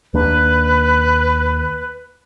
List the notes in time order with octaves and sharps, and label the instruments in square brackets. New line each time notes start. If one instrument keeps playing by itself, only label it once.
[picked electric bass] D#2 A#3 D4 [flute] B4